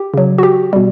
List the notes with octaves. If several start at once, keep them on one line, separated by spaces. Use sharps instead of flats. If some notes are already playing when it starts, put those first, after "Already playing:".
Already playing: G4
C#3 F#3
F#4
G4
B2 G3